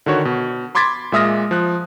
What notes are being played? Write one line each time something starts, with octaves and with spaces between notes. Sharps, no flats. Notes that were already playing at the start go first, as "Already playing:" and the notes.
D3 D#3 F#4 C#5
B2
B5 C6 D6 G#6 A6 B6
A#2 G#3 E5 D#6 F6 A#6
F3 F#6